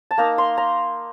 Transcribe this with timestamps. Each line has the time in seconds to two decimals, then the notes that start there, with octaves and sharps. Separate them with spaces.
0.11 A5
0.18 A#3 D#4 A#5
0.38 C6
0.58 A#5